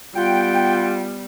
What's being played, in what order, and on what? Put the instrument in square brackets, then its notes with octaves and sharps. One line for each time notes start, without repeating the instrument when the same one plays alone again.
[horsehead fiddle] G3 B3 [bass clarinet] F4 [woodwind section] F#5 G5